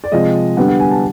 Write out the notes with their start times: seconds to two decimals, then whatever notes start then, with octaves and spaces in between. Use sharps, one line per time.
0.04 D5
0.12 C3 F3 G#3 D#5
0.57 D3 G3 B3 F#5
0.68 F#5
0.80 G#5
0.91 A5